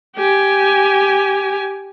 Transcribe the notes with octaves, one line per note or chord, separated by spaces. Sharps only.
G4 G#5